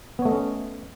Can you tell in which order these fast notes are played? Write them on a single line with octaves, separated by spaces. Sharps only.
B3 C#5 A3 D#5 C#4